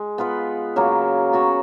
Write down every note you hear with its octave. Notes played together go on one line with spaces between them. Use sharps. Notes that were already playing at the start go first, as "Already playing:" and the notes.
Already playing: G#3
B3 F4 B4
C#3 F#3 A#3 C#4
B3 F#4 C#5